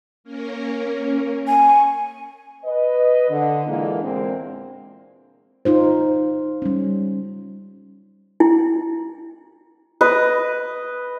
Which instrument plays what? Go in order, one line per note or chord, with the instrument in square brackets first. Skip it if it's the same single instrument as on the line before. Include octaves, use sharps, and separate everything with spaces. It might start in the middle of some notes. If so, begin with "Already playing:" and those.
[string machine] A#3 C#4 A#4
[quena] G#5 [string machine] C#6
[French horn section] B4 D#5
D3
A#2 D3 E3 G#3 A#3
E2 A#2 G#3 C4 D4 A#4
[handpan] D#4 F4 C5
G3 C#4
[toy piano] E4
[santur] B4 D#5